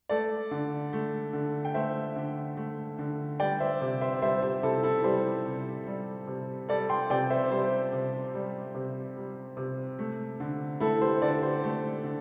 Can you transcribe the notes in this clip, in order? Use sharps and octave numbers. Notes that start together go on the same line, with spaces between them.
A3 A4 D5
D3
A3
D3
G5
A3 C5 E5
D3
A3
D3
G3 D5 G5
C5 E5
C3
C5 E5
G3 C5 E5
G4
C3 E4 A4
E4 A4
G3 G4 C5
C3
G3
C3
G3 A4 D5
G5 C6
C3 D5 G5
C5 E5
G3 G4 C5
C3
G3
C3
G3
C3
A3
D3
A3 E4 A4
G4 C5
D3 A4 D5
G4 C5
A3
D3